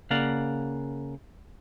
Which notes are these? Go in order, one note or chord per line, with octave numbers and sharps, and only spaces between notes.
C#3 A#3 D5 F5 F#5